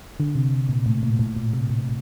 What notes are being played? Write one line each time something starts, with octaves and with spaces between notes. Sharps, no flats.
D3
C3
A#2
A2
A#2
A2
A#2
C3
A2